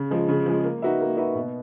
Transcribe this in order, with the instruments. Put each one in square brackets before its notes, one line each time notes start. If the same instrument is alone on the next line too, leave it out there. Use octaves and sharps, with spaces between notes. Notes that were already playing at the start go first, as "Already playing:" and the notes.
Already playing: [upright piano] C#3
F3 G#3
C#3
F3 G#3
A#3
D#4 F#4 B4 E5
A#3
D#4 F#4 B4 E5
B2